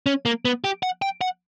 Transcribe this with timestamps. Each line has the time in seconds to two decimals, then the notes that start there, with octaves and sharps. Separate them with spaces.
0.06 C#4
0.25 A#3
0.45 B3
0.64 G4
0.83 F#5
1.02 G5
1.21 F#5